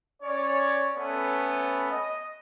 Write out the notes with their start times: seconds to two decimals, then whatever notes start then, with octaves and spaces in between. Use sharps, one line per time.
0.23 C#4 C#5 D5
0.96 A3 B3 C#4 A4 B4 B5
1.92 D#5